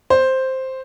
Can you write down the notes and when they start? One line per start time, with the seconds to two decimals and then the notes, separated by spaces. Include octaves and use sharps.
0.10 C5